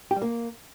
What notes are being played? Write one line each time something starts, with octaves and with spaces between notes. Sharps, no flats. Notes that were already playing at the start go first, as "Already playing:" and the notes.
G4
G3
A#3